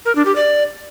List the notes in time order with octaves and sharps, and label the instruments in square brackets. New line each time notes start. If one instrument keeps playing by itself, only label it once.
[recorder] A#4
D4
G4
D5